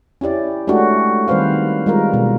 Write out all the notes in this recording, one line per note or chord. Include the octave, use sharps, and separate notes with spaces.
C#4 E4 G4 D5
G#3 A3 C#4 D4 F#4 G4
D#3 G3 C4 B4 C5 F5
G3 G#3 F4 A#4
B2 G#3